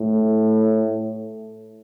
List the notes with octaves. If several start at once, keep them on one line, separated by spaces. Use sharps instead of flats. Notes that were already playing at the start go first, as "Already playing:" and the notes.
Already playing: A2